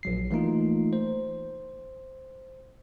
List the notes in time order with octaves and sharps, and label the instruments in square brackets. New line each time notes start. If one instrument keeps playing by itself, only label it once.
[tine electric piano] A#1 F#3 C7
E3 A3 A#3 D#4 F4
C5